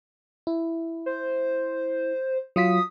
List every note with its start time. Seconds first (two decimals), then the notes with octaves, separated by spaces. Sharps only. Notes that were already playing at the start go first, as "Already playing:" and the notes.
0.47 E4
1.06 C5
2.56 F#3 F4 D#6 B6